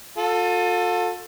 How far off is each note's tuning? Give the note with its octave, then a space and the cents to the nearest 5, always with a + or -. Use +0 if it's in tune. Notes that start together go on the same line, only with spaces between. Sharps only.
F4 +40 A4 +15